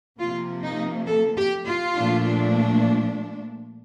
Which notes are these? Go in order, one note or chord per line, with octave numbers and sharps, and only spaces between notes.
C3 F3 A#3 F4
D#4
A4
G4
F4
A#2 F3 A3 D4